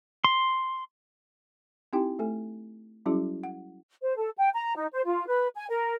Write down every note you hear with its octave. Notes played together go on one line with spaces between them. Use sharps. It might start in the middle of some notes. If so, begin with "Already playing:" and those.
C6
C4 D#4 E4 G4 G5
A3 A4 G#5
F#3 G3 C#4 E4 F#4 G#4
F#5
C5
A4
G5
A#5
D#4
C5
F4
B4
G#5
A#4